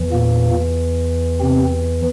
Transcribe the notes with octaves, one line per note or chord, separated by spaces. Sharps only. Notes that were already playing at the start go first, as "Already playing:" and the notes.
Already playing: E2 E3
A#2 A#3
C3 C4